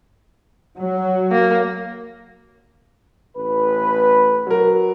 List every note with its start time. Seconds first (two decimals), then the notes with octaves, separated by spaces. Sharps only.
0.76 F#3
1.31 A#3
3.37 A1 B4
4.47 F#3 A#4